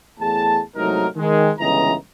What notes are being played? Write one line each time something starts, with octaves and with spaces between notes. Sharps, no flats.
E2 A2 G#4 A5
C2 G#2 F#3 A3 D#4 A#4
D#3 G#3
G1 C#2 C#3 E3 D#5 A#5